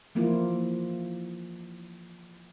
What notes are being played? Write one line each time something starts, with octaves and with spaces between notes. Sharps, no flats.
E3 F3 A#3 E4 F4